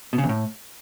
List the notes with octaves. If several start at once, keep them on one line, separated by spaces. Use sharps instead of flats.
B2
C#3
E2
A2